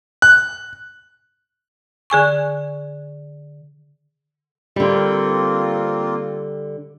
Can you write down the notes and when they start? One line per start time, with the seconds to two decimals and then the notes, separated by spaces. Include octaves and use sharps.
0.22 F#6
2.10 D3 G#4 G#5 C#6
4.76 D3 G3 A#3 C4 F4